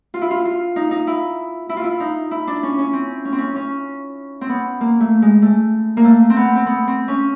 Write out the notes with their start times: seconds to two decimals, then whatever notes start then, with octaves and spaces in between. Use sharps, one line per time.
0.14 F4
0.21 E4
0.31 F4
0.45 F4
0.76 D#4
0.91 D#4
1.07 E4
1.69 E4
1.77 F4
1.84 E4
2.00 D#4
2.31 E4
2.47 D4
2.63 C#4
2.78 C#4
2.93 C4
3.25 C#4
3.33 C4
3.39 C#4
3.56 C#4
4.41 C4
4.49 B3
4.81 A#3
5.00 A3
5.22 G#3
5.42 A3
5.97 A#3
6.04 A3
6.30 C4
6.36 B3
6.56 C4
6.66 B3
6.88 C4
7.08 C#4